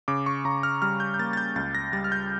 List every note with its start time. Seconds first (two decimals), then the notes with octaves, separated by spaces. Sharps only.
0.08 C#3 D6
0.26 C#6
0.45 C#3 A#5
0.63 F6
0.82 G3 F6
1.00 G6
1.14 G6
1.19 A#3 A6
1.33 A6
1.37 G6
1.56 C#2 A6
1.75 A#6
1.93 G3 A6
2.04 F6
2.12 G6